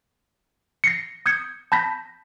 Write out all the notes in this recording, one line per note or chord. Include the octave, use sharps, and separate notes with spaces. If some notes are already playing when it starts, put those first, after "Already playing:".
A#6 C7 C#7
D#6 G6 G#6 C#7
A5 B5 G6 A#6 B6